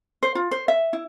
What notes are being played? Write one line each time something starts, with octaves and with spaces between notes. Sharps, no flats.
C5
F4
C5
E5
E4